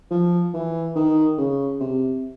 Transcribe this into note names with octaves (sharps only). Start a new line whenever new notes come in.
F3
E3
D#3
C#3
C3